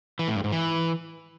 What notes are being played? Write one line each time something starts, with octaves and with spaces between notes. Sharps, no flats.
E3
A2
G2
G#2
E3